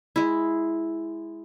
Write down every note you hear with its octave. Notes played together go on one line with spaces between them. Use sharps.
G#3 E4